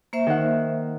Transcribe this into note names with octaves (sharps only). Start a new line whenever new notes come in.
A#3 C5 E5
D#3 F#5